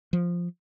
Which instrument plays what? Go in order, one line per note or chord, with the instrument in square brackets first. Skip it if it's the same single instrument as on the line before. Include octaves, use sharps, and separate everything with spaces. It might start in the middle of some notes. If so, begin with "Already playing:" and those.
[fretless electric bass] F3